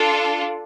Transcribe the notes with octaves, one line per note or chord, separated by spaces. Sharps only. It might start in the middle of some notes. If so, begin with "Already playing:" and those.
Already playing: D4 F4 A4